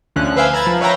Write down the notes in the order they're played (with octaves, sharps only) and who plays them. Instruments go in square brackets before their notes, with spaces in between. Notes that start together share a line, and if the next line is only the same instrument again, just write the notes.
[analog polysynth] D2 D3 F3 C#4 F#6
B4 C5 E5 F5 G5 G#5
A#5 B5 G#6 A6
F3
B4 C#5 E5 F5 G5 A#5